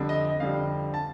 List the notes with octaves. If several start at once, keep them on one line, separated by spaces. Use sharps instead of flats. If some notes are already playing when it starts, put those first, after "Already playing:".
Already playing: F2 D3 G3
D#5
D#5
F2 D3 G3 F5
A5